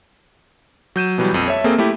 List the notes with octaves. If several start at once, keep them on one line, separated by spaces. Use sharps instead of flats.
F#3 G6 D#7 E7
B2 E3 F#3 G3
A#1 F2 D#7
C#5 E5 A5
A#3 C4 G#4 A4
A3 E4 G4